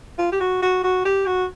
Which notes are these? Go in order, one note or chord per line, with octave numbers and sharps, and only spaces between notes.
F4
G4
F#4
F#4
F#4
G4
F#4